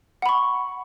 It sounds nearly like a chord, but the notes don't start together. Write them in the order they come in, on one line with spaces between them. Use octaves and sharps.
F#5 B5 C#6